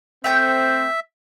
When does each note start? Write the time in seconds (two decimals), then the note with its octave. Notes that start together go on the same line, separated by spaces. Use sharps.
0.24 A3 C4 E5 G5 G6